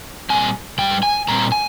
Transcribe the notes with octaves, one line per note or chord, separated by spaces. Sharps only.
A#2 G3 C4 G#5
G#2 G3 G5
G#5
A#2 G3 C4 A#5
G#5